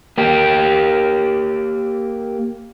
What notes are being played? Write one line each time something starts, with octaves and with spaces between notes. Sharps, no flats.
A#3 G4